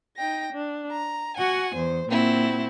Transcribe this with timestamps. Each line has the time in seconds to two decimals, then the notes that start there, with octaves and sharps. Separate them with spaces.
0.17 D#4 G5 A#6
0.53 D4
0.91 A#5
1.37 F#4 F#5 G#5
1.75 E2 C5
2.09 A#2 A#3 C4 E4 F#4